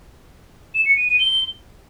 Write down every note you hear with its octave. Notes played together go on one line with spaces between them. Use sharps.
E7
C#7
D#7
D#7
G7